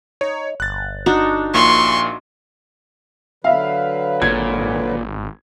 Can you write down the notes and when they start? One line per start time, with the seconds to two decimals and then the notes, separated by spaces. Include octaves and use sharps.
0.21 D#4 C#5
0.60 G1 F#6 A6
1.06 D4 D#4 F#4
1.54 A#1 A#2 C6 C#6
3.44 D3 F#3 B4 E5 F5
4.22 G#1 A#2 G#6